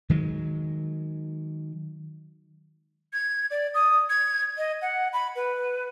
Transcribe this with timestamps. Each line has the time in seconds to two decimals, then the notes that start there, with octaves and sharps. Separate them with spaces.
0.10 D#3 F#3 G#3
3.13 G#6
3.51 D5
3.74 D#6
4.10 G#6
4.58 D#5
4.82 F#5
5.13 B5
5.36 B4